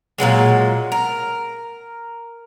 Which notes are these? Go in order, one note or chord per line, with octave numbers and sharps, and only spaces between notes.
A#2 D3 F#3 G#3
A#4